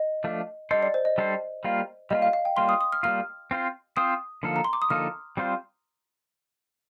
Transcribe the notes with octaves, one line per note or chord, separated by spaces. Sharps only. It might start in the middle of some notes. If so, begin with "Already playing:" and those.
Already playing: D#5
F3 A3 D4
G3 D4 A4 C5 D#5
D5
C5
D#5
G3 D4 A4 C5
G3 A#3 F4
G3 A#3 F4 D#5
F5
F5
G5
G3 A#3 F4 C6
D#6
D#6
F6
G3 A#3 F4 F6
C4 F4 C5
C4 F4 C5 D#6
D3 F3 A#3 D#4 A4
A#5
C6
D6
D#6
D3 F3 A#3 D#4 A4 F6
G3 C4 F4 C5